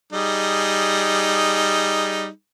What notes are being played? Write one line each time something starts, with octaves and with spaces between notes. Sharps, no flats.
G3 D#4 G#4